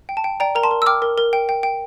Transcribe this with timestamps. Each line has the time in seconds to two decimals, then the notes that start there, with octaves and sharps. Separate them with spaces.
0.09 G5
0.17 A5
0.24 G5
0.40 D5 G5 A#5
0.55 A#4 A#5
0.63 A5 C6
0.71 A#4
0.82 E6
0.86 G5 D6 F6
1.02 A#4
1.18 A#4
1.33 G5
1.49 G5
1.63 G5